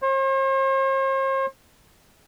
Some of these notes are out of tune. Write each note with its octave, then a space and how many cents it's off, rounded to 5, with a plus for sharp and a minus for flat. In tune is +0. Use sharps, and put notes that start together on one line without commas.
C5 +45